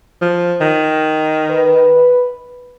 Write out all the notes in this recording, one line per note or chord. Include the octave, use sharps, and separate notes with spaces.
F3
D#3
B4